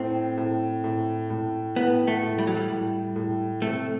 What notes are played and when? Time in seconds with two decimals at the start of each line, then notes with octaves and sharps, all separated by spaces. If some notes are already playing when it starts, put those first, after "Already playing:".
Already playing: A2 C4
0.38 A2
0.84 A2
1.30 A2
1.76 A2 B3
2.08 A3
2.23 A2
2.38 G3
2.47 F#3
2.56 G3
2.70 A2
3.16 A2
3.62 C3 A3